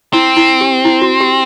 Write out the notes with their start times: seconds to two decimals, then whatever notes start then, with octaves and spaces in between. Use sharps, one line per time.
0.13 C4 E4
0.37 E4
0.61 G4
0.85 E4
1.02 F#4
1.20 G4